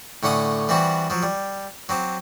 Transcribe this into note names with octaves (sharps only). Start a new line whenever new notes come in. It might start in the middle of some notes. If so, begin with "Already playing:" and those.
A2 D3 C#4 F#5 D6 D#6
E3 G3 C4 F#4
F3 F#3
G3
F#3 C4 D6